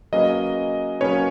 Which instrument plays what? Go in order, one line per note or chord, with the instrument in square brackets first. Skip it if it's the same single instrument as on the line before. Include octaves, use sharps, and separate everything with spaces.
[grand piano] F#3 A#3 C#4 G#4 B4 [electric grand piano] D#5
[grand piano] F#3 A#3 C#4 G#4 B4 [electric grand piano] C#5